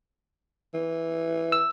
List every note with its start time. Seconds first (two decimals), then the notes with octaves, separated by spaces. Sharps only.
0.74 E3
1.52 E6